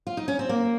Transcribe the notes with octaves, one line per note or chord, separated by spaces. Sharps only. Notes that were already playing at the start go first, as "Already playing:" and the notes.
F4
D#4
C#4
C4
A#3